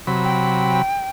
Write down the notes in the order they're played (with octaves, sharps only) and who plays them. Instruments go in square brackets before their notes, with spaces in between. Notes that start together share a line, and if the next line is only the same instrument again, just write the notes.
[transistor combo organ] C3 F#3 B5
[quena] G5